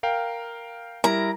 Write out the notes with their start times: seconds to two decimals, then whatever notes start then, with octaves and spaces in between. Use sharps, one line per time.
0.03 A#4 F5 G5
1.04 G3 E4 A#4 A#5